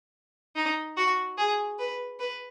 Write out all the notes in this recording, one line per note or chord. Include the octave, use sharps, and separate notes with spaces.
D#4
F#4
G#4
B4
B4